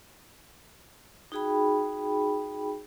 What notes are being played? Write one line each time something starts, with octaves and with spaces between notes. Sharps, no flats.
D#4 F#4 G#4 G5 B5